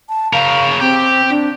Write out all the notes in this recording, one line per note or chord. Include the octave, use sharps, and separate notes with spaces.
A5
C#3 A#4 F5
C4 G4
D4